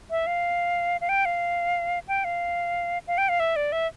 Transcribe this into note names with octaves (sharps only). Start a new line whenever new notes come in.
E5
F5
F5
G5
F5
G5
F5
F5
G5
F5
E5
D5
E5